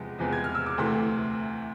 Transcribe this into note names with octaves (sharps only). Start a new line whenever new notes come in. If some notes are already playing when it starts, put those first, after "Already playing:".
Already playing: E2 C3 F3 G#3 B3
E2 C3 F3 G#3 B3
G#6
F6
E6
D6
D2 C3 E3 A3 C6